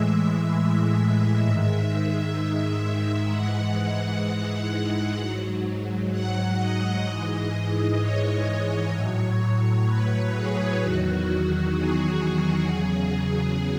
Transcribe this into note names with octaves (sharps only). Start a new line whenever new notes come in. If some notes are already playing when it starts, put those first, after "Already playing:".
Already playing: A2 E3 G#3 E5
G#2 D#3 G#3
G#2 E3 G#3 F#5
G#2 F#3
F#5
D#5
G#2 E3 G#3
C#5
A2 F#3
B4
G#4
E2 D#3 F#3 F#4
F#4
F#4
G#4
E2 C#3 F#3